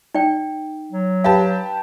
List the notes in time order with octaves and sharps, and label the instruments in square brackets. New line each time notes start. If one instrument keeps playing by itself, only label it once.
[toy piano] D#4 D5 G5
[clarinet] F#3
[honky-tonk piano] G4 B4 A5 [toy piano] F5